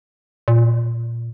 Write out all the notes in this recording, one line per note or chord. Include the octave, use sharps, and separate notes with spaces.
A#2